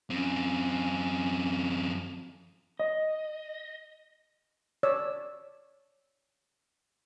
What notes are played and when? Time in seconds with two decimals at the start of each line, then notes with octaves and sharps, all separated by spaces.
0.10 F#2 C4 C#4
2.79 D#5
4.83 C#5 D5 E6